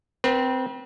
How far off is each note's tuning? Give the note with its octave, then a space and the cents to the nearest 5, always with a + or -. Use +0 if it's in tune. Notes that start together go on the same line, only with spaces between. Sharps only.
C4 -15 B4 -40